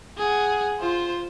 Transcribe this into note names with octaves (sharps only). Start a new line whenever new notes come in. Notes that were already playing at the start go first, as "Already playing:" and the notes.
G#4 F#5
F4 C5